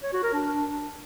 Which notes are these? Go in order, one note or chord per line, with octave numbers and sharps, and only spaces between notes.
C#5
F#4
A#4
D4